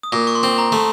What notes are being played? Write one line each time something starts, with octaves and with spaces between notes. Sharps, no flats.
D#6
A#2 C#6
C#6
C6
C4
A#5
A3